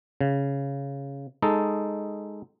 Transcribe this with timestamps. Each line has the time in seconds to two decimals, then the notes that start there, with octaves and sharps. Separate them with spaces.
0.21 C#3
1.42 G#3 D#4 A4